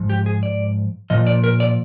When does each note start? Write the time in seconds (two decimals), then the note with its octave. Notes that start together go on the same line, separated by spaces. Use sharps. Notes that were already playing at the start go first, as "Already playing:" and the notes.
Already playing: G#2 F3
0.10 G4
0.26 G#4
0.43 D5
1.10 A#2 F3 D#5
1.27 D5
1.44 A#4
1.60 D5